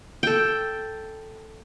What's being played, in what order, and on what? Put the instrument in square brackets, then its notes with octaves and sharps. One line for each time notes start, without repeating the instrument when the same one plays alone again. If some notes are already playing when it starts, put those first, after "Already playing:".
[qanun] A4 G5